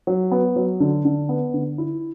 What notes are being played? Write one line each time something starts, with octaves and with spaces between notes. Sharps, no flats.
F#3
B3
F#3
D3
D3
B3
D3
E4